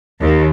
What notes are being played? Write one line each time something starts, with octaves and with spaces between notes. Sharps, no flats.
D#2